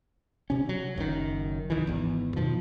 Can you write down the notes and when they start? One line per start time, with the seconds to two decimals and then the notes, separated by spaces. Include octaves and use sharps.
0.50 C3 C#4
0.69 F#3
0.96 F#1 F#2 B2 D#3
1.70 C2 D#3 E3
1.87 G#1 E2
2.36 F#2 B2 D#3 F3